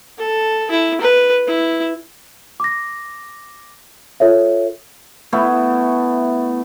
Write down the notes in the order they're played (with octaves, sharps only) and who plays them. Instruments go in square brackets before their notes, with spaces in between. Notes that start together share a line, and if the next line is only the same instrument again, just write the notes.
[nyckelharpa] A4
E4
B4
E4
[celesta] D6 A#6
F4 A4 C#5 E5
[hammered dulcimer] A3 B3 E4